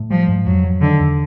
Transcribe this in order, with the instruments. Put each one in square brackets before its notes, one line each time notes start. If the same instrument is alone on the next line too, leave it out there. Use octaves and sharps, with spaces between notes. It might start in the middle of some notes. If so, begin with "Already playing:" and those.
Already playing: [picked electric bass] A2
[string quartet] F3 [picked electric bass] G3
[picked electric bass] G#2
[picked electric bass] F2 [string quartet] F#3
[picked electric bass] F#3
[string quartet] D3 [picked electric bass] D#3
[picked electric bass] E2